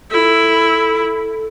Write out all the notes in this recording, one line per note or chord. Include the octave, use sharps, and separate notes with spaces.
E4 A4